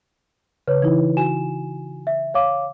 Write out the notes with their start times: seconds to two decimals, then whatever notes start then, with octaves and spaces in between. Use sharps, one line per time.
0.68 C#3 B4 C#5
0.82 E3 D#4 E4
1.17 F#4 G#5 E7
2.07 E5
2.34 C#5 F5 D6